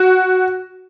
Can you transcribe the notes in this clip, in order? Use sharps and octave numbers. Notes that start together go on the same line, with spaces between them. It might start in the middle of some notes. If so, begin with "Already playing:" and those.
Already playing: F#4